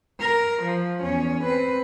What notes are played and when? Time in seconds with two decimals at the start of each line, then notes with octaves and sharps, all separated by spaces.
0.21 A#4
0.63 F3
1.03 E2 C#4
1.44 C4 B4